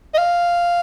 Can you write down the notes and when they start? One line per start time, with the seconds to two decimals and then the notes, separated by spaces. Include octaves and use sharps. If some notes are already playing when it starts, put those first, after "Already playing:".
0.14 D#5
0.18 F5